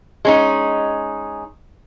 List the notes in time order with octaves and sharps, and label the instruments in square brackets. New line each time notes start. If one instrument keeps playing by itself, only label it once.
[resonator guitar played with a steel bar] G#3 C#4 D#4